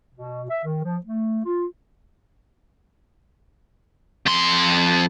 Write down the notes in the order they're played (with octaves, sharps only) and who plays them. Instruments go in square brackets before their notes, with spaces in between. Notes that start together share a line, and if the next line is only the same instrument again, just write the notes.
[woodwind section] B2
E5
D#3
F3
A3
F4
[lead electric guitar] F2 C6